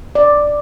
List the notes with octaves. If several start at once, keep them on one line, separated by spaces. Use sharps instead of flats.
D5